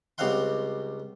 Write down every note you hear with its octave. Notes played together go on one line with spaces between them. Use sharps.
C#2 G3 C4 F5 F#5 C6